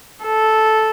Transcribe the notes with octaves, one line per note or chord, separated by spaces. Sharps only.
A4